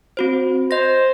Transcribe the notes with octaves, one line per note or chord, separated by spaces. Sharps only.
C4 F#4 C5
C5 D#5 A#6